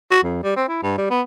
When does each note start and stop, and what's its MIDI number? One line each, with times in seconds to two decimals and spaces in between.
0.11 0.21 66
0.23 0.40 41
0.43 0.56 55
0.56 0.63 60
0.68 0.82 64
0.83 0.93 43
0.98 1.08 55
1.10 1.21 59